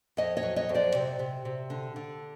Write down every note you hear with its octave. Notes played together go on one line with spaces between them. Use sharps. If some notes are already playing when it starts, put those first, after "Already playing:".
F2 C#5 D#5
C#5 D#5
F#3
C#5 D#5
F2
C5 D5
C3
C3
C3
D3
D3